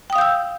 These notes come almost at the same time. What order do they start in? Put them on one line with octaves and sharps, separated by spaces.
G5 D#6 F5 G6 E6